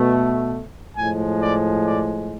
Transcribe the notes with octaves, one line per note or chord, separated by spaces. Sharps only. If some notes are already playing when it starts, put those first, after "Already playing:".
Already playing: B2 A3
A2 F3 G#3 G#5
D5
D5